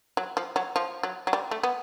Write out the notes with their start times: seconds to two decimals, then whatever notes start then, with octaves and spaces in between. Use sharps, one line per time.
0.17 F#3
0.37 F3
0.56 F#3
0.76 F3
1.03 F#3
1.27 F#3
1.33 G3
1.51 A3
1.63 B3